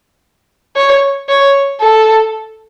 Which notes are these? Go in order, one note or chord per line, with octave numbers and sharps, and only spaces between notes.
C#5
C#5
A4